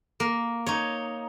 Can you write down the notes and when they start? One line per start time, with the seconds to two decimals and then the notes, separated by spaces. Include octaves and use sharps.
0.20 A#3
0.66 D#4 C#5